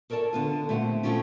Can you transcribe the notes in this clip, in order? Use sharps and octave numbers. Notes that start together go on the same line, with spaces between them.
A4 A#4 C#5 D5 A5
D3 B3 F4
A#2 A3 C4 G4 F#5
C#3 A3 C4 C#4 F4 G4